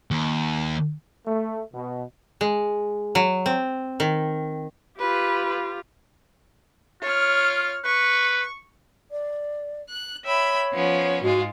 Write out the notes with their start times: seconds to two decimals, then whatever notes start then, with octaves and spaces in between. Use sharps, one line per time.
0.11 D#2
1.27 A3
1.74 B2
2.41 G#3
3.15 F#3
3.46 C4
4.00 D#3
4.99 F4 G4 B4
7.02 F4 C#5 F6
7.85 B4 C#6
9.11 D5
9.89 F#6
10.25 C#5 E5 G5 B5
10.72 F3 B3 C#4
11.22 G#2 G#3 F4 F#4